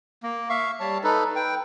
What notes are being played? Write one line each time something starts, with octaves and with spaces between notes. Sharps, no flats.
A#3
E5 F5 C#6
G3 C#5 A5
D#4 A4 B4
B4 G5